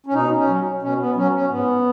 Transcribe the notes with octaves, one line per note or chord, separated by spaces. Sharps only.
C#4
B2 D#4
C#4
F#3
B2 C#4
B3
F#3 C#4
C#4
G#2 B3